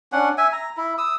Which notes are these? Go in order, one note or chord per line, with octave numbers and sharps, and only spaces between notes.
C#4 D4 F#5
E5 G#5
A#5
E4
D#6 E6